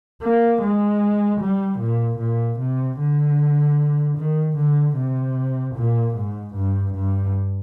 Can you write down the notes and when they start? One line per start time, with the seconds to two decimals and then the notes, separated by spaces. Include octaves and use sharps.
0.22 A#3
0.61 G#3
1.40 G3
1.79 A#2
2.19 A#2
2.59 C3
2.99 D3
4.17 D#3
4.57 D3
4.96 C3
5.75 A#2
6.15 G#2
6.54 G2
6.94 G2